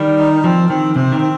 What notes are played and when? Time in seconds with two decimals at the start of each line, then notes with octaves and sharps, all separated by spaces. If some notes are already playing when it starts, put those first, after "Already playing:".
Already playing: D#3 G3
0.19 D#4
0.44 F3 C4
0.69 D#3 C4
0.95 C3 C4
1.12 D#3
1.21 C4